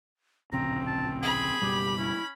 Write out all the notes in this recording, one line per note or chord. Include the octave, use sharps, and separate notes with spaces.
D1 A#1 C#3 C4 A#5
A5
G#4 B5
F#1 B2 G3 G4
C#4 E4